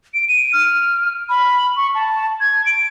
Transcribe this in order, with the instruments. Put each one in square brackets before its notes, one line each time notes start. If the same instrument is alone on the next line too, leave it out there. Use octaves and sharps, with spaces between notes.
[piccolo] D7
D#7
F6
B5
C#6
A5
G#6
D7